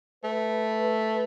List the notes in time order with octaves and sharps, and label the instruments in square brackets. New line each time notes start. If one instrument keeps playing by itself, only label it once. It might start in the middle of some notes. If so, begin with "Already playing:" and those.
[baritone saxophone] A3 [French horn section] B4